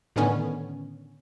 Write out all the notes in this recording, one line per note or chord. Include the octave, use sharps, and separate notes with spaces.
A2 D3 D#3 B3 C#4